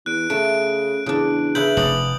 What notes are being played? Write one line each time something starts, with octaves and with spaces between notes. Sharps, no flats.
E2 F#6 D7
C#3 A3 D7
E2 C#3 D4
C#3 E4 B4 G6 F#7
F1 C#5 D5 D#6 F#7